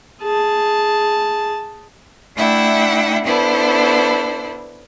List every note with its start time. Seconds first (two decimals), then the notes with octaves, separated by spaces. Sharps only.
0.22 G#4 A5
2.36 A3 D4 E4 E5 F#5 G5
3.25 B3 D4 E4 A4 B4 C5